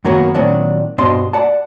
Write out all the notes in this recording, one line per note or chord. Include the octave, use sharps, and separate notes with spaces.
F#2 D#3 F#3 A#3 B3 F#4
A#2 D#3 F#3 C4 D4
G2 B2 D4 C5 D#5 C6
D5 F#5 A5